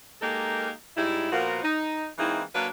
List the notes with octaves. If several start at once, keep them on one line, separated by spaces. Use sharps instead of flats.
G#3 A#3 D#4 G4 A4 A#4
G#2 G3 D#4 E4
A#2 F3 B3 F4 F#4 A#4
D#4
E3 G#3 A#3 C4 D#4 E4
F#3 A#3 D4 B4 F5